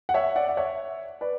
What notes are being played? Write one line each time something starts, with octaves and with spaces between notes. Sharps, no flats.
F#5
C#5 E5
D5 F#5
D5
C#5 E5
B4 D5